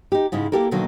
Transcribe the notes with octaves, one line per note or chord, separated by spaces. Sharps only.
D#4 G4
G#2 C#3 G#3 E4
A#3 E4 G4 A4 A#4
B2 D3 D#3 F#3 A#3